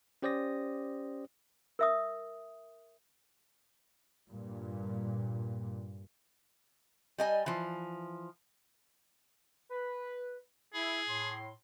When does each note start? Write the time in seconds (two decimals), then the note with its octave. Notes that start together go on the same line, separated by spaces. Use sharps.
0.22 C#4 G4 C5 D5 D#6 A#6
1.79 A#4 E5 D#6
4.29 G2 A#2
7.18 G3 D#5 G#5
7.46 E3 F3
9.70 B4
10.74 E4 G#4
11.08 A2 C6